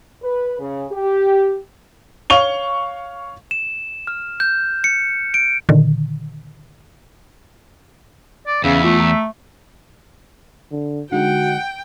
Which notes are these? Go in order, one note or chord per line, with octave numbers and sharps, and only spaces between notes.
B4
C#3
G4
C#5 F5 C#6 F7 G7
E7
F6
G6
C#7
D7
A#2 D3 D#3
D5
E2 C#3 E3 C#4 E5
A3 F4
A#5
D3
D3 G#3 D#4 F#4 F#5 G5